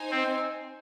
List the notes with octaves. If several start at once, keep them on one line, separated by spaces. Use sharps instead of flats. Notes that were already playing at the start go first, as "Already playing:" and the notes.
Already playing: D#4 C5 G#5
C4